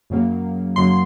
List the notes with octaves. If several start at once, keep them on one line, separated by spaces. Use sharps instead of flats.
F#2 C#3 F#3 A#3
F#2 C#3 F#3 A#3 C6